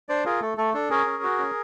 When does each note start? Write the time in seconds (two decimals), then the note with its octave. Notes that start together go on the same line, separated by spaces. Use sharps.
0.09 D4 C5 D5
0.25 F4 G#4 A#4
0.41 A3 A4
0.58 A3 A4
0.74 D4 A4
0.90 C#4 G#4 A#4
1.06 C#4
1.23 F#4
1.38 C#4